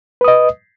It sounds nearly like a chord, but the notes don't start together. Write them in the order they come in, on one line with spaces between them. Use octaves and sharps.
B4 D#6 D#5